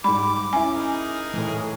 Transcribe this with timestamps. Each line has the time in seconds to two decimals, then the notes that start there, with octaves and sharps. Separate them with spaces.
0.04 G#2 G3 B5 D6
0.53 C#4 E4 G#5
0.74 D#4 G#4 A#4
1.34 A2 E3